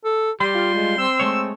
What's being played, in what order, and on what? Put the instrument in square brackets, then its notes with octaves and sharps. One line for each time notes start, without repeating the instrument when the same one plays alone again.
[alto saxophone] A4
[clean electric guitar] G3 [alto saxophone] G4 [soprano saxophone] C6
[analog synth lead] F4
[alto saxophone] G#3
[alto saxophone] C4 [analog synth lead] E6
[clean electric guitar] G#3 A3 C#5